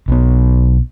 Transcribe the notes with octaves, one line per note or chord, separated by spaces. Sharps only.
B1 B3